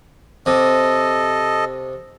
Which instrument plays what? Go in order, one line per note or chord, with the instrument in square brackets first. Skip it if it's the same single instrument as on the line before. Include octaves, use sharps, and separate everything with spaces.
[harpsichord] C3 [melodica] A4 D#5